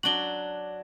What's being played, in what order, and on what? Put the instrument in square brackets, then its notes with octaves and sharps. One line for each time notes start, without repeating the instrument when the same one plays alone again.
[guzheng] F#3 D4 F#4 [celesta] F#7 G7